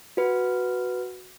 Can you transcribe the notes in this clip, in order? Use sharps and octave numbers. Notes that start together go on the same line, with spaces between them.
F#4 B4